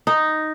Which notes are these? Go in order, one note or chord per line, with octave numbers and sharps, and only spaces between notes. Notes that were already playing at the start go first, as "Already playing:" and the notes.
D#4